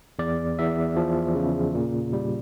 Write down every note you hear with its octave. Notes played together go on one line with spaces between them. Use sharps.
E2 D5
E2 E5
F3
C#3
A#2
G3